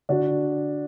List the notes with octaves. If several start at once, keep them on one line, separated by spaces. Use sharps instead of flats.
D3 D4 F#4